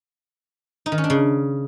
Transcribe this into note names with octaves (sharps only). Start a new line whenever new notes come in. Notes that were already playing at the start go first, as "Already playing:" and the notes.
D#4
D#3
C#4
D4
C#3